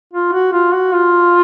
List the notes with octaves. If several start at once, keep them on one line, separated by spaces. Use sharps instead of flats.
F4
F#4
F4
F#4
F4